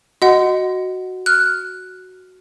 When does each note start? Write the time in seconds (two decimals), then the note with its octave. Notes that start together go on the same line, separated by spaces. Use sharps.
0.22 F#4 D#5 F#5
1.26 F6 F#6